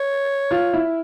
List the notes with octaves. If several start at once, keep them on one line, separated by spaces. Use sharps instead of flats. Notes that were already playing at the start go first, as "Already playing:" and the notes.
Already playing: C#5
F4
E4